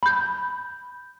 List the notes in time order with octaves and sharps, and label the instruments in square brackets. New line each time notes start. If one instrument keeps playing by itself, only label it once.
[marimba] B5 G6